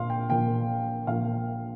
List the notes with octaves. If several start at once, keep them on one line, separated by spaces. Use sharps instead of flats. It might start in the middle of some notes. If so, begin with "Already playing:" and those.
Already playing: A#1 A#2 F3 A#3 F5 C6
G5
A#1 A#2 F3 A#3 G5
A#1 A#2 F3 A#3 F5